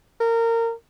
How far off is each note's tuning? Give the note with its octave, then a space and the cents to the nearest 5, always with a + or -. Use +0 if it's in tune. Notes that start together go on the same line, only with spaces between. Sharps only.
A#4 -25